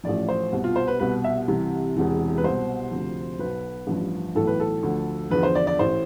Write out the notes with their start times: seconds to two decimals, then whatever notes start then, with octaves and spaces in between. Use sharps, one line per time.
0.04 A1 A2 F3 D5
0.29 C5
0.52 C2 B2
0.64 F4
0.76 C5
0.88 B4
0.99 C2 B2 B4
1.24 E5
1.48 C2 C3 E3
1.96 E1 E2 C3 E3
2.38 B4
2.44 C2 B2 C5
2.91 D2 C3 F3
3.39 B1 B2 B4
3.87 A1 G2 F3
4.35 B1 A2 E3 A4
4.47 B4
4.60 A4
4.83 D2 D3 F3
5.31 E2 D3 F3 B4
5.43 C5
5.55 D5
5.67 D5
5.79 A1 A2 E3 C5